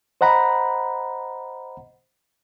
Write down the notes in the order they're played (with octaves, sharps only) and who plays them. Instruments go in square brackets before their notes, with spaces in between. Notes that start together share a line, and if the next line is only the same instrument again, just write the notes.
[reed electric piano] C5 D#5 F#5 A#5 B5